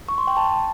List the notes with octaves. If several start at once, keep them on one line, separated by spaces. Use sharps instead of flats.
C#6
C6
G5
A5